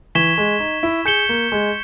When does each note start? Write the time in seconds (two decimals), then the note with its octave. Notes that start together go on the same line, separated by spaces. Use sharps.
0.15 E3 C#6 G#6 B6 E7 G7
0.38 G#3
0.60 D#4
0.83 E4
1.05 G#4 G6 C#7 E7 G7
1.29 A#3
1.52 G#3